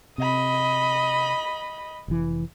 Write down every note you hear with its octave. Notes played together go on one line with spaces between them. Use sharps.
C3 D#5 B5
F1 E3